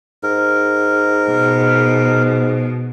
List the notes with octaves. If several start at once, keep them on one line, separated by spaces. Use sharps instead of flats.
G#2 A#4
B2